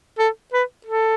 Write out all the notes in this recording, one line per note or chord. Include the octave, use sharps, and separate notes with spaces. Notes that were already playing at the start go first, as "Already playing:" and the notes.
A4
B4
A4